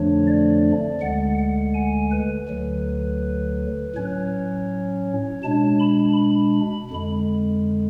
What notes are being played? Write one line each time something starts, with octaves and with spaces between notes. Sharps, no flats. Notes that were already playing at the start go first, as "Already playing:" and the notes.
Already playing: F2 D3 F3 A3 D4 C#5
D5
D2 D3 G#3 F#5
F#5
G#5
B4
D2 D3 F#3
A2 F#3 C#4 C#5
B2 G#3 D4 A5
B5
B5
F2 D3 G#3